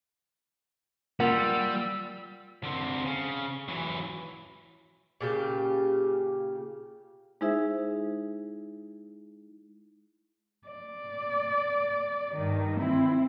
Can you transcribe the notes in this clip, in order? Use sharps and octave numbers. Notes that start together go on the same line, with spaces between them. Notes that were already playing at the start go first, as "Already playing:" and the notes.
G3 A#3 F4 F#5 E6
D3 C4
C#3
E3 F#3
A#2 C#3 G4
G#3 D#4 E4 G#4 C5 E5
D5
G2 D#3
C4 E4